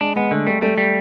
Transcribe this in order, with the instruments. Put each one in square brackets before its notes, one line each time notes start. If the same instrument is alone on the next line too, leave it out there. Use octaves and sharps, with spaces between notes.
[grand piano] G#3 [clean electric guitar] D4
[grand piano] G#3 [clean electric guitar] B3
[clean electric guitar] D3 [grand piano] A3
[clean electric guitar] G3 [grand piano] A3
[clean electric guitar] G3 [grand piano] A3
[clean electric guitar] G3